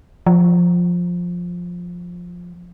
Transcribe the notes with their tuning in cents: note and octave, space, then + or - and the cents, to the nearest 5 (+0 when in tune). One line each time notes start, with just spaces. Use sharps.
F3 +10